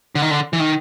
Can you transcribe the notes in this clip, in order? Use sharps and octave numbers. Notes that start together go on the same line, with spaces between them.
D3
D#3
D3
E3
D#3